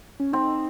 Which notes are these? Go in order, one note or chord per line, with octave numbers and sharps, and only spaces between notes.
C#4
C4 D#4